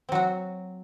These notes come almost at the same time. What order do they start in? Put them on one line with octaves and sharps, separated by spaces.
C4 F#3 F#4